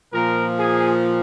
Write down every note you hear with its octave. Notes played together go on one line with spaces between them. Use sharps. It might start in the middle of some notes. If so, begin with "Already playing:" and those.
A#2 F3 A#4
G#4